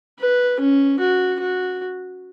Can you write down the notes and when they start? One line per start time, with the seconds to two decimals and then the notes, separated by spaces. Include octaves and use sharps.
0.19 B4
0.60 C#4
1.00 F#4
1.41 F#4